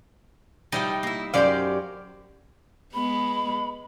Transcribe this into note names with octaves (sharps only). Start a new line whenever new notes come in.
F3 G3 D#4 E4 G4 D#5
A#3 E4
F#2 G4 C5 D5 F5
G#3 B3 B5